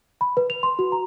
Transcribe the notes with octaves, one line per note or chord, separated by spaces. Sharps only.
B5
B4
F7
C6
F#4
A#5